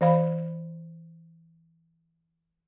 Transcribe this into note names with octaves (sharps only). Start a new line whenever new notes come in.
E3 C5 F5 B5